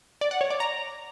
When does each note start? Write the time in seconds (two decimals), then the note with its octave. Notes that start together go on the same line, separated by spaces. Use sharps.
0.21 D5
0.31 F#5
0.41 C#5
0.50 D5
0.60 A#5